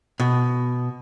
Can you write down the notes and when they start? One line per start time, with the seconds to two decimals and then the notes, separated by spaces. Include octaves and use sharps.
0.20 B2